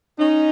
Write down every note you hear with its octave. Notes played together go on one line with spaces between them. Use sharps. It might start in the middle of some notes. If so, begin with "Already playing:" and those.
C#4 D#4